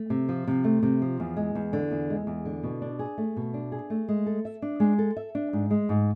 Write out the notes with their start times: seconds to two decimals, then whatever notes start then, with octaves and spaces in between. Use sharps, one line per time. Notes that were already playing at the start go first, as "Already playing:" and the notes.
Already playing: A3
0.10 C3
0.29 F3
0.47 C3
0.64 A3
0.83 C3
1.02 F3
1.20 E2
1.37 G#3
1.55 E2
1.73 D3
1.91 E2
2.10 G#3
2.27 E2
2.45 D3
2.63 B2
2.82 D4
2.99 G#4
3.18 A3
3.37 B2
3.54 D4
3.72 G#4
3.90 A3
4.09 G#3
4.26 A4
4.45 E5
4.62 D4
4.80 G#3
4.98 A4
5.17 E5
5.35 D4
5.53 G#2
5.71 G#3
5.89 G#2